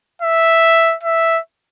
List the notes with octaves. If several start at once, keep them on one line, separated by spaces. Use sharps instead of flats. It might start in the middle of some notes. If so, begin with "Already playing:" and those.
E5
E5